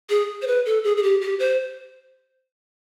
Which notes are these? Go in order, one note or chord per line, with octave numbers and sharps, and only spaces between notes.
G#4
C5
B4
A4
G#4
G#4
G4
G4
C5